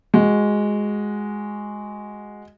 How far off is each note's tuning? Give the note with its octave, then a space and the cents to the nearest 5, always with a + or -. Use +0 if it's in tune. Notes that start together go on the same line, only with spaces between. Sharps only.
G#3 +0 F#4 +0